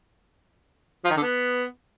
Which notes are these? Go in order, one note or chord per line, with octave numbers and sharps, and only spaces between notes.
F3
D#3
D3
B3